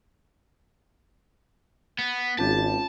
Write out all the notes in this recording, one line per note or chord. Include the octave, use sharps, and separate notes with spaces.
B3
G#1 C#4 F4 A5